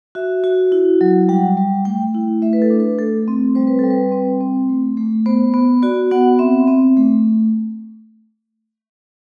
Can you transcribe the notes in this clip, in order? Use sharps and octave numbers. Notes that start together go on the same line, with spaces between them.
F#4 E5
F#4
E4
F#3
G3 F#5
G3
A3 G5
E4
A3 E5
B4
A4
D4
B4
A3 A4
C4
G3 C5
B4
A4
G3
B4
C4
C4
A3
A3
B3 C5
B3
F#4 D5
B3 F#5
C4 E5
C4
A3